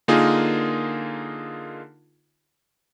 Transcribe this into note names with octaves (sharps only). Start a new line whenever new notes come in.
D3 A#3 D#4 F4 G#4 A#4